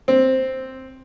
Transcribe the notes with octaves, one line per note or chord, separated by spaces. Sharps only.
C4